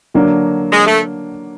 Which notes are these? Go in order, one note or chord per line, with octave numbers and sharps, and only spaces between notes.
D3 F#3 A#3 D4
G#3
A3